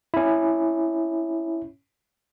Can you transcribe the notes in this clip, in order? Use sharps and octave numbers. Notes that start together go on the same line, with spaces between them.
C#4 E4